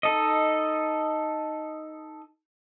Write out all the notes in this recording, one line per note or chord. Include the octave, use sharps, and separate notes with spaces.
D#4 A4 D#5